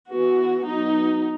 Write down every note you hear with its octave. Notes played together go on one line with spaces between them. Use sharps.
E3 B3 F#4
F#3 B3 D#4